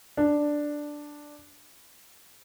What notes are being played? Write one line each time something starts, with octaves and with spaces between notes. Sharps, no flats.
D4